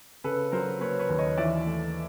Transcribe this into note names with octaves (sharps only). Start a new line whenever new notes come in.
C#3 A4 B4
F#3 A#4 C5
A#3 B4 C#5
B4 C#5
D#2
C#5 D#5
E3 D5 E5
A3